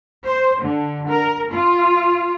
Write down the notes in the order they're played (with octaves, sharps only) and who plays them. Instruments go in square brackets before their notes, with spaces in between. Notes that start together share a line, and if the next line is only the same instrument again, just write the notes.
[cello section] C5
D3
A#4
F4